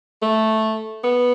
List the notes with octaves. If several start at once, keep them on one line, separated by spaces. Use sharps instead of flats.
A3
B3